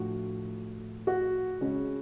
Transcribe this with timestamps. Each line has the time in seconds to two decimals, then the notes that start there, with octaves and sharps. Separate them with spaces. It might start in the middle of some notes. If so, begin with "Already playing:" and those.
Already playing: A2 F3 D4 F#4
1.07 F#4
1.61 C#3 G#3 C#4